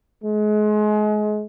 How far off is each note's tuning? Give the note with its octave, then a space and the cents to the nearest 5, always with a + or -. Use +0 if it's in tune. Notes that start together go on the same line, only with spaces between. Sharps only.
G#3 +30